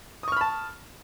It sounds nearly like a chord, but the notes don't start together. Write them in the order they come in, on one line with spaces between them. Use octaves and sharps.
D#6 C#6 F6 B5 A5